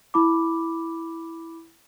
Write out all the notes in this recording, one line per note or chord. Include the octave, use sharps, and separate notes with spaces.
E4 B5 D6